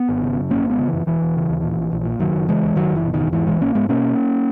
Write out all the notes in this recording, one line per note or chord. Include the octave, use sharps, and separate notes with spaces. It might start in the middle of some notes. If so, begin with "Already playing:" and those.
Already playing: B3
G#1
C#3
F#2
G#1 A#3 C#4
G#1
G#3 B3
C#3
E3
F#2
E1 E3
E1
C#3
D#2
A#2
A#1
A#1
A#2
F#1 D#3 F#3
F#1
C#3 E3 G#3
E2
F#1 D#3 F#3
F#1 E3
B2
D#3
E2
G#2 E3
A#1 E3 G#3
A#1 A#3 C#4
G#2 G#3 B3
B2 A#3 C#4